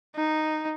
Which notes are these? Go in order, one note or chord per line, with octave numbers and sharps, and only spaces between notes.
D#4